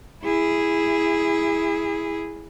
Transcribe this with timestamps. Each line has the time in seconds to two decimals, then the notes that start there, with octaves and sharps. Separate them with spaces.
0.24 E4 G#4